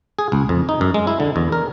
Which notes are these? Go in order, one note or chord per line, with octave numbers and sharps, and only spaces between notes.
G#4
C#2
F2
D#4
F#2
G#3
E4
D3
E2
A#4